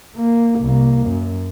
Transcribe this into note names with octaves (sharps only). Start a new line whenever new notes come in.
A#3
C2 A#3
F#2